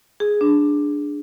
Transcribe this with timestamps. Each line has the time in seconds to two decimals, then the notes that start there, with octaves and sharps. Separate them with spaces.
0.20 G#4
0.41 D4